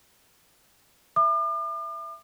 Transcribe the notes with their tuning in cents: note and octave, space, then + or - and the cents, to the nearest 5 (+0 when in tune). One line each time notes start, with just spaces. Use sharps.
E5 +10 D6 +45